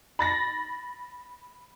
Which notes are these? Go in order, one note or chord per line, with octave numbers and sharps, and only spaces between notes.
B5 A6 A#6